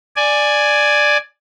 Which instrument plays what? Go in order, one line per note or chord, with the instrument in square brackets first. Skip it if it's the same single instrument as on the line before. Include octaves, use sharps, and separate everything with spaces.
[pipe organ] D5 G#5